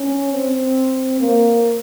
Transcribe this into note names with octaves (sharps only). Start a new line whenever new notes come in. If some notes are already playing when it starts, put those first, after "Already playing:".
Already playing: C#4
C4
A#3